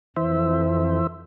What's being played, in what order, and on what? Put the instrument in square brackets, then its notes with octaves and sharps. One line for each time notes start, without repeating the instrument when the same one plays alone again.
[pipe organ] F2 [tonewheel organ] E3 C5 E5